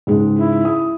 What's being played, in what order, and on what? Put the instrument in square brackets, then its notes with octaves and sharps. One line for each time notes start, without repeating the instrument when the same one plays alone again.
[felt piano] C#2 G#2 G#3
[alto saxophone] E4
[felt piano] D#6